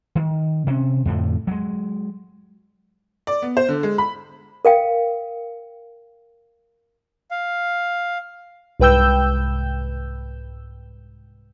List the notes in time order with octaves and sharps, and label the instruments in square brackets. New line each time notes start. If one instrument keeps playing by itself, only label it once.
[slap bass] D#3
C3 C#4
F2 A2 D3 F3
F#3 G#3
[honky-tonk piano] D5
B3
C5
D3
G#3
B5
[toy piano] A#4 F5 G5
[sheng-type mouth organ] F5
[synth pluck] C2 G#2 B4 G5 E6 G6